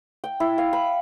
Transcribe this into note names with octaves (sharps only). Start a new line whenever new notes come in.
G5
E4
F5
B5